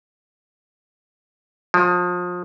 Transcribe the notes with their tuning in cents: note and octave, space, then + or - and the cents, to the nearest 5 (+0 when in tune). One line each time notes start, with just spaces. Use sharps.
F3 +30